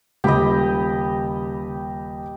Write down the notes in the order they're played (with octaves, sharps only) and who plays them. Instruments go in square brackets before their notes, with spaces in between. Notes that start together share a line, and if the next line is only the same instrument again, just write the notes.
[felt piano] D#1 G5 [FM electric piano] C#3 B5 [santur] G4 D#5